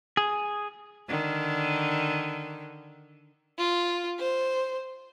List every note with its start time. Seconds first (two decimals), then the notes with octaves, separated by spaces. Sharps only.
0.17 G#4
1.08 D3 D#3
3.58 F4
4.19 C5